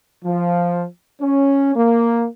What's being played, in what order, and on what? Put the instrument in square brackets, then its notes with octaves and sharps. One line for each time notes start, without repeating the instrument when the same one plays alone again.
[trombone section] F3
C#4
A#3